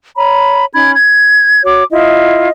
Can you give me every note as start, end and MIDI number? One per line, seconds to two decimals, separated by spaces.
0.16 0.65 73
0.16 0.65 82
0.16 0.65 83
0.72 0.93 61
0.72 0.93 63
0.72 0.93 83
0.72 0.93 92
0.94 1.61 92
1.64 1.83 66
1.64 1.83 73
1.64 1.83 86
1.91 2.48 64
1.91 2.48 65
1.91 2.48 75